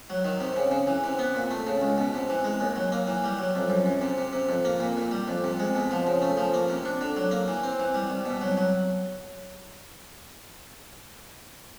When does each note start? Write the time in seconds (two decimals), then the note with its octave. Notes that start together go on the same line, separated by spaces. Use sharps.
0.10 F#3
0.25 D#3
0.40 C3
0.56 C#3
0.71 C#3
0.87 E3
1.04 C3
1.19 B3
1.35 A#2
1.51 A3
1.67 C#3
1.81 C#2
1.98 B2
2.14 C3
2.30 E3
2.44 G#3
2.60 D#2
2.76 F#3
2.92 A#3
3.07 E3
3.24 G3
3.39 F#3
3.55 F2
3.70 F#2
3.86 F#2
4.02 C3
4.18 C3
4.33 C3
4.49 F2
4.65 A#3
4.80 A#2
4.97 A#2
5.11 G3
5.28 F2
5.44 C3
5.60 G#3
5.75 B2
5.91 F3
6.07 C#3
6.22 A3
6.37 F3
6.54 A#3
6.69 C3
6.85 D4
7.01 D3
7.17 F#3
7.31 A#3
7.48 E3
7.63 C4
7.80 E3
7.95 G3
8.10 C2
8.26 B2
8.41 F#3
8.57 F#3